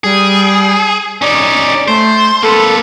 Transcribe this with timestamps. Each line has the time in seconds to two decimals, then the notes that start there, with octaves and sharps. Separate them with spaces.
0.04 G3 G#4
1.22 C#4 D#4 D5
1.88 A3 C5
2.43 A#3 A4 B4